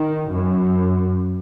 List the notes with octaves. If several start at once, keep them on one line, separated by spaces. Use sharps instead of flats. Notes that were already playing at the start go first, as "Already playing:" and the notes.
Already playing: D#3
F#2